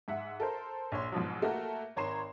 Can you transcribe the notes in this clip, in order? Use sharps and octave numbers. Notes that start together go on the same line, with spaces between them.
G#2 E5 F#5
A4 A#4 C5
A#1 C#5 C6
G#2 B2 F3 F#3
A3 A#3 F#4 A#4
G#1 C#5 A#5 C6 C7 E7